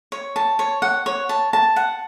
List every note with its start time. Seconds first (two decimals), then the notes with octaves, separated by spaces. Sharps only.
0.12 C#5
0.36 A5
0.59 C#5
0.82 F#5
1.06 C#5
1.29 A5
1.53 A5
1.76 F#5